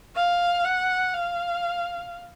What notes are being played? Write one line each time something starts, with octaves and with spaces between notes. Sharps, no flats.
F5
F#5
F5